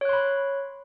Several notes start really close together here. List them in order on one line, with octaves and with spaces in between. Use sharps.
C#5 F#6 C6 B5